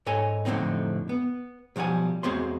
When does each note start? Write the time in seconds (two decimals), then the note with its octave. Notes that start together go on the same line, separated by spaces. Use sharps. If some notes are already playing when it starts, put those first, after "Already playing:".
0.06 G#2 A4 C#5 D#5 G#5
0.45 F2 A2 D3 D#3 C4 D#4
1.09 B3
1.76 B1 F3 G3 F#5 G#5
2.23 E2 G#3 C4 F#4 C5 C6